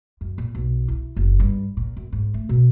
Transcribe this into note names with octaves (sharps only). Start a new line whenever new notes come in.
F#2
A#2
B1
E4
F#1
G2
A#2
F#2
G#2
A3
B2